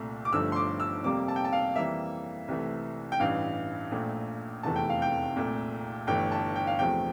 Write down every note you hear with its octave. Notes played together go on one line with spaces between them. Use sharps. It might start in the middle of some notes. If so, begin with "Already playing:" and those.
Already playing: C2 A#2 A3
D6
G1 G2 D3 F3 A3 E6
C6
D6
E6
F2 C3 G3 A#3 D6
A5
G5
A5
F5
F2 E3 G3 A#3 E5
C2 C3 E3 A3
G5
A1 G2 E3 F5
A#1 A#2 A3
F1 E2 C3 E3 A3 A5
G5
F5
G5
C2 A#2 A3
G1 G2 E3 A3 G5
A5
G5
F5
E2 C3 F3 A3 G5